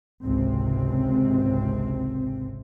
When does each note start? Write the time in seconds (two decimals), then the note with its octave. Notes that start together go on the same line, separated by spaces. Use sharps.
0.24 G#1 C#2 C3 C4